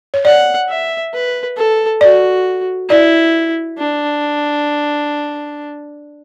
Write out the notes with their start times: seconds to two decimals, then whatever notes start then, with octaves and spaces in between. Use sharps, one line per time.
0.14 C#5
0.25 D5 F#5
0.68 E5
1.13 B4
1.57 A4
2.01 F#4 D5
2.89 E4 D5
3.78 D4